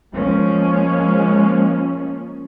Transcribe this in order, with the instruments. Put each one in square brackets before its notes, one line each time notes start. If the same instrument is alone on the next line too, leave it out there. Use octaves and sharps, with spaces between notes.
[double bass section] F3 G#3 A#3 C#4